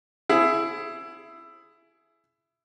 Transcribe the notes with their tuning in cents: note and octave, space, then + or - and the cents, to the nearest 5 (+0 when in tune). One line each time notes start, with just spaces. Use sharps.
E4 +15 G#4 +25